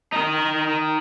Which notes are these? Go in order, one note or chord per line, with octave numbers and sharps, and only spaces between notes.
D#4 A#4